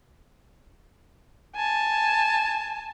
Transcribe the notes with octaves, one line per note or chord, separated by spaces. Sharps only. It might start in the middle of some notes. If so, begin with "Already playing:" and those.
G#5 A5